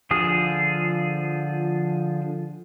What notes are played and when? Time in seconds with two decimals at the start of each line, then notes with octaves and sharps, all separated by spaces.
0.11 D3 F3 G#4 D#6